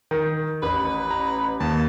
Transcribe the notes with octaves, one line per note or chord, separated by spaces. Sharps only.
D#3
A1 B4
A#5
D#2 A5